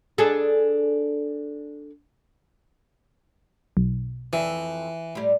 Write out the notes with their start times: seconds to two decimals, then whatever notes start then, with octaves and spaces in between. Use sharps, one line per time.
0.18 D4 G#4 A4
3.77 B1
4.33 F2 E3 E5
5.15 A2 G3